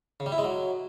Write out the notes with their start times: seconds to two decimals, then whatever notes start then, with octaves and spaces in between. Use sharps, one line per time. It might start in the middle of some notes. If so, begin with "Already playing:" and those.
0.20 C#3
0.26 G3
0.32 E4
0.38 G#3
0.44 F#3